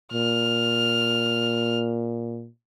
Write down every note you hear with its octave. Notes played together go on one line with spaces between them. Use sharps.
A#2 F6